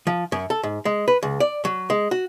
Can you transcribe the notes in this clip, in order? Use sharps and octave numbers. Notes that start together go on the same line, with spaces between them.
F3
F#2
A4
G#2
G#3
B4
C#2
D5
F#3
G#3
F#4